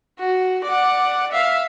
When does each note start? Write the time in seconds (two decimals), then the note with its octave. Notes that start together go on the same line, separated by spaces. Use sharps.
0.20 F#4
0.64 D5 F#5
1.32 E5 F5